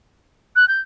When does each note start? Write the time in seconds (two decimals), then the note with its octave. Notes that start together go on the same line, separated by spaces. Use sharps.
0.56 F#6
0.68 G6